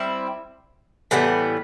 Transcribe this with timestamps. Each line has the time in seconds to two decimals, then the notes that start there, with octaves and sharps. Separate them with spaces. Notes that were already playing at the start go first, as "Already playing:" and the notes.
Already playing: G3 C4 E4
1.11 A2 E3 G3 B3